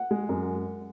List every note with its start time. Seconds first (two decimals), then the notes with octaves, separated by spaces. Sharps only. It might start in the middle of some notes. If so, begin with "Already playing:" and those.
Already playing: F#5
0.11 G#3
0.29 F#2